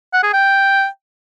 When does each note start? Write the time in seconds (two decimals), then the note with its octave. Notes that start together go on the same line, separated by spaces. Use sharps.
0.13 F#5
0.23 G#4
0.33 G5